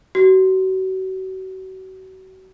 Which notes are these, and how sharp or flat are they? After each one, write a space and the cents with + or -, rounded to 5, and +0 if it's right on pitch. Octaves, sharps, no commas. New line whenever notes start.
F#4 +35